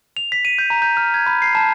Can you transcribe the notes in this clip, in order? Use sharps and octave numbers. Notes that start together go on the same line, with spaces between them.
F7
B6
D#7
G6
A#5
G6
F6
G#6
B5
C7
A5